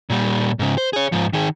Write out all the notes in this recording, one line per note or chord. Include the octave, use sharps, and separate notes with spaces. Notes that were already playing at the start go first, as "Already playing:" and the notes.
A#2 G3
G#2 C#3
C5
G#4 C#5
G#2 F3
D#3 G#4